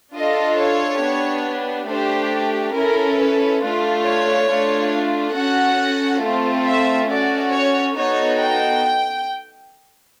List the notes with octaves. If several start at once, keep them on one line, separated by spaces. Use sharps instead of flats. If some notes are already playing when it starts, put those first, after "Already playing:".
D4 F4 A4 D#5
C#5
B3 D4 G4
A3 D4 G4 C5
C#4 E4 A4 A#4
B4
A3 D4 F4
C#5
A3 D4 F4
C#4 F#4 A4 F#5
A3 C4 F4 A4
E5
C#4 F#4 A4 D5
C#5
B3 D#4 F#4 A4 C#5
G5